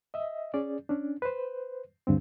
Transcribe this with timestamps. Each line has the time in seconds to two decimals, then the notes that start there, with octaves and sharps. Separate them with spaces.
0.14 D#5 E5
0.54 C#4 G#4 D5
0.89 C#4 D4
1.22 B4 C5
2.07 D2 G2 D3 C4